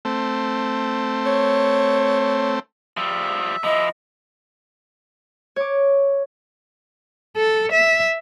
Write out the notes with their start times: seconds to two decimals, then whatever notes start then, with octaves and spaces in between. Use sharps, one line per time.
0.05 A3 C4
1.26 C#5
2.97 F3 G3 E5
3.64 F3 E4 D#5
5.56 C#5 D6
7.37 A4
7.72 E5